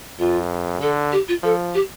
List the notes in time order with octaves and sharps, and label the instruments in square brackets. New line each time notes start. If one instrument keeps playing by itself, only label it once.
[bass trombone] F2 [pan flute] F4
[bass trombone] D3 [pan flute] A4
[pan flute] G4
F4
[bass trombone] F3 [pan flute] A4
[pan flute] G4